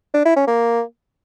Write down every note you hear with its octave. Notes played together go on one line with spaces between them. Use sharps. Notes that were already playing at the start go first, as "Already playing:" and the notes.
D4
E4
C#4
A#3